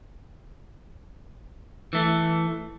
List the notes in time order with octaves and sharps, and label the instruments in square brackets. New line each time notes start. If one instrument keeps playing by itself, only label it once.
[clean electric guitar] E3 A3